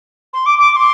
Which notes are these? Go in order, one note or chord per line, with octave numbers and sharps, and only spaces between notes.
C6
D6
D6
D6
C6